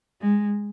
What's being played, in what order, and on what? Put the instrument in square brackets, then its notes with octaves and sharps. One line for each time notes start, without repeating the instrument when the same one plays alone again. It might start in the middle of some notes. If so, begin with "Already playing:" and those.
[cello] G#3